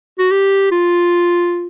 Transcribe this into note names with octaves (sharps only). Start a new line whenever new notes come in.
F#4
G4
F4